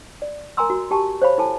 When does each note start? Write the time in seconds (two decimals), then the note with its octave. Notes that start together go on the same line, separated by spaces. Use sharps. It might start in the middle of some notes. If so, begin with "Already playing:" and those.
0.22 D5
0.57 A#4 G#5 A#5 C6 E6
0.70 F#4
0.91 G4 G#5 A5 C#6
1.22 C5 C#5 F5 B5
1.38 E4 A4 G#5 A5